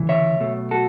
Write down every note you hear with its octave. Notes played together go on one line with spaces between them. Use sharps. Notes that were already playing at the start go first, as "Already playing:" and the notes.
Already playing: D2 C#3 E3
C#5 E5
B1 B2 A3
F#4 A4